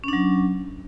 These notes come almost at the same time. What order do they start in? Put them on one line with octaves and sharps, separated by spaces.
C#4 D4 F#3